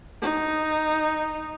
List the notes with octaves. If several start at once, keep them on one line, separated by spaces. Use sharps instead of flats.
D#4